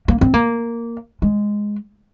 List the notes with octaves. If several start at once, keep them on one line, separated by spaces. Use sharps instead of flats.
A#3
C4
A#3
G#3